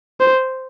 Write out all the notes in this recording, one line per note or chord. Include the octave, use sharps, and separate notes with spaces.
C5